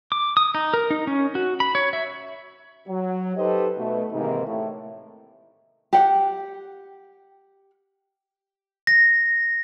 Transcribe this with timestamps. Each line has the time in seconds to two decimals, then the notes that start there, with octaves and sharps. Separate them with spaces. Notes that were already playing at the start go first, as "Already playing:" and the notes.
0.12 D6
0.37 D#6
0.55 D#4
0.74 A#4
0.90 D#4
1.07 C#4
1.35 F#4
1.60 B5
1.75 C#5
1.93 E5
2.89 F#3
3.37 D#4 G4 A4 B4 C5 D#5
3.78 B2 A3
4.12 G#2 C3 D#3 E3 A#3 D#4
4.46 A2 A3
5.93 G4 F#5
8.87 A#6